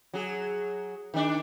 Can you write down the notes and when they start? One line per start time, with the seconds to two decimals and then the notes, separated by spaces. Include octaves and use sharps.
0.13 F#3 G#4
1.14 D#3 D4